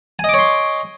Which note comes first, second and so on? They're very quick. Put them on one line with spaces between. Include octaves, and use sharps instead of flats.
G#5 D#5 D6 C#5 C6